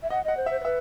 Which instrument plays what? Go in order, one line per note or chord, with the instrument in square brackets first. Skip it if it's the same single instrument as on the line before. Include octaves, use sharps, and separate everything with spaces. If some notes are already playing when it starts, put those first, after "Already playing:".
[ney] E5
[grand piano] D#5 [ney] F#5
[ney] D#5 [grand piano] F#5
[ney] C5
[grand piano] E5
[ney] C5
C5
[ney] B4 [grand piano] E5